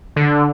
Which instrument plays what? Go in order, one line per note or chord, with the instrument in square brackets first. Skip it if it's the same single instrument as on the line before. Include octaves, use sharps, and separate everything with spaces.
[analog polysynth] D3